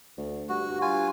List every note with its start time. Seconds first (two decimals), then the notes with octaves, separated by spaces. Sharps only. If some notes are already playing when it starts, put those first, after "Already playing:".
0.18 D2
0.49 G2 F#4
0.69 G2
0.82 F4 G#5